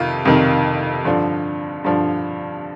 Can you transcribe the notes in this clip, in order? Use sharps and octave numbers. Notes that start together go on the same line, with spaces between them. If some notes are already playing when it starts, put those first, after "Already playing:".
Already playing: F2 C3 D#3 F4
F2 C3 D#3
G2 D3 F3
G2 D3 F3